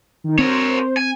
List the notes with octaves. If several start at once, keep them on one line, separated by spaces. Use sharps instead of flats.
D#3 D#4
C4 A#4 C5 C#5
G#5